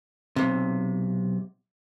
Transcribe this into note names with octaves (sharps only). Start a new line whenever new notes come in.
B1 C3